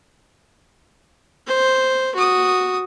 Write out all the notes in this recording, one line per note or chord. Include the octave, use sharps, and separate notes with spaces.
C5
F#4 D#6